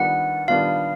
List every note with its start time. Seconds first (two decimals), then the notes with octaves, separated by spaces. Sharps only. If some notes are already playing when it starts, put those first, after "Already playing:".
Already playing: D#3 G3 B3 D4 F4 F#5
0.48 D#3 G3 B3 D4 F4 F5